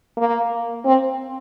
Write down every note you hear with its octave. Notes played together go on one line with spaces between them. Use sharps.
A#3
C4